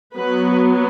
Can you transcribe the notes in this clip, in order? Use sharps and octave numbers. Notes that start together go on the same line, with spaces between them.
F#3 B3 B4